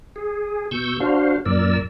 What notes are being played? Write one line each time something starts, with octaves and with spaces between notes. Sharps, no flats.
G#4
B2 C#6 E6 G6
D4 F#4 C5 F5
F#2 A#2 A#4 D5 E6